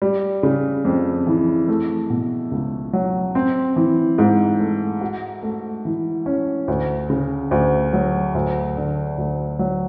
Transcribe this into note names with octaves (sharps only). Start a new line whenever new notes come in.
G3
C#3
F2
E3
A3
B2
C#2
F#3
C4
E3
G#2
A3
F#4
A3
E3
C#4
D2
C#3
D2
F#3
D2
D3
D2
F#3